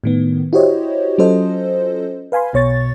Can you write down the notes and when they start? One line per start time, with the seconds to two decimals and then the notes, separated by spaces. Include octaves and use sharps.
0.04 A2 D#3 B3
0.53 E4 F#4 G4 C5 C#5 D#5
1.18 F#3 C#4 F4 A4 C5 D#5
2.32 B4 F5 G#5 B5 C6
2.53 B1 B2 C#5 C#6 A6